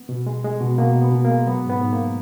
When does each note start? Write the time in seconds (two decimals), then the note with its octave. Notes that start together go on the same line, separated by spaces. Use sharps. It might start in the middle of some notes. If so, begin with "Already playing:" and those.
Already playing: B3
0.09 B2
0.27 G#3
0.44 G#3
0.61 B2
0.78 B2 A#3
0.96 B2
1.01 B3
1.12 B2
1.25 A#3
1.30 G#3
1.46 F#3 B3
1.65 G#2 B3
1.81 G#2
1.93 A#3